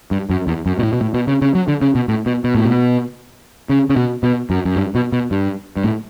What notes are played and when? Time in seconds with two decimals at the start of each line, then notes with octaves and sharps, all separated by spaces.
0.11 G2
0.30 F#2
0.47 E2
0.66 F#2
0.79 B2
0.83 A2
0.93 B2
1.01 A2
1.14 B2
1.27 C#3
1.42 C#3
1.55 F#3
1.68 D3
1.82 C#3
1.95 B2
2.08 A2
2.26 B2
2.44 B2
2.55 A2
2.65 B2
3.69 C#3
3.90 C#3
3.96 B2
4.23 B2
4.50 F#2
4.65 F#2
4.76 G2
4.95 B2
5.12 B2
5.31 G2
5.76 G2
5.84 A2